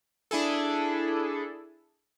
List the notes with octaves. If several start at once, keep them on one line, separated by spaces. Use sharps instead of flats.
D4 E4 G#4 A4